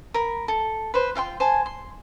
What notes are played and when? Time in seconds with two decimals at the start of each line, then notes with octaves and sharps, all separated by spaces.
0.14 A#4 B5
0.48 A4
0.94 B4 C5
1.15 F4 F5 G5 C6
1.40 C5 G#5 A5
1.66 C6